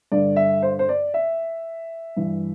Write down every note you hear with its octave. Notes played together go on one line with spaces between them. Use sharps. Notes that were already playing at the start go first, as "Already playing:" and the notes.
G2 D3 D5
E5
C5
C5
D5
E5
G2 E3